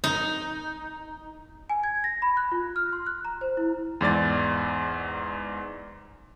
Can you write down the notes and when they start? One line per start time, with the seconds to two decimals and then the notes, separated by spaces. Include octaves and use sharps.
0.04 D#4
1.70 G#5
1.84 G#6
2.04 A#6
2.22 B5
2.37 F#6
2.52 F4
2.76 F6
2.93 C6
3.06 F#6
3.25 A#5
3.41 C5
3.57 E4
4.01 E2 G#2 D5 A6